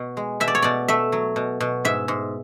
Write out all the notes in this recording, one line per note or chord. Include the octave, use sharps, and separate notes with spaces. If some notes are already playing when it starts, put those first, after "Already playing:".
Already playing: B2
G#3
B2 E5
D5
C#5
B2 D5
A3 E5
F#3
B2
B2
G#2 E5
G#2